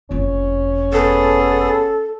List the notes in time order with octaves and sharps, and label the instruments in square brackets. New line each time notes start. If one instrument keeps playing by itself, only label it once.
[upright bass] F#1 F2 [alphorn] C#4
[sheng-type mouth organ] B3 G#4 [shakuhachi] A4